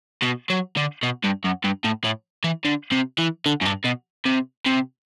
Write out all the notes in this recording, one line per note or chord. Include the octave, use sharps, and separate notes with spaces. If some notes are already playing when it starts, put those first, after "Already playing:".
B2
F#3
D3
B2
G2
F#2
G2
A2
A2
E3
D3
C3
E3
D3
F#2
G2
B2
C3
C3